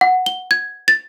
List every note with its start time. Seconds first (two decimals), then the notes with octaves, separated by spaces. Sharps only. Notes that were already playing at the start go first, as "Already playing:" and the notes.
0.01 F#5
0.26 G7
0.51 G#6
0.88 A6